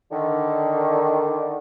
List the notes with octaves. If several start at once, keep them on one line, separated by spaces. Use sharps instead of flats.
D3 D#3